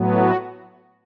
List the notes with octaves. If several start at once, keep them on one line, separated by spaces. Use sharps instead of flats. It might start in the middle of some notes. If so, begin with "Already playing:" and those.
Already playing: A2 F#3 B3
F#4